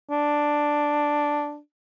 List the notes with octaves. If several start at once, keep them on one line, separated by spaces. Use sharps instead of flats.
D4